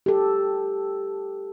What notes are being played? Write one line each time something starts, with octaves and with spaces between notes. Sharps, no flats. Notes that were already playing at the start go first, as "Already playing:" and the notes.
G4 A4